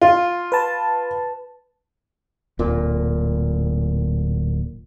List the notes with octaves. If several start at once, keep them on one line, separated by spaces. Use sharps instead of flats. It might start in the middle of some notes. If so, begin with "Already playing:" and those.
F4
B4 A5
D1 A#2